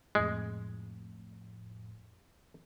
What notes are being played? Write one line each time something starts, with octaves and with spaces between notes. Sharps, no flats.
F2 A2 G#3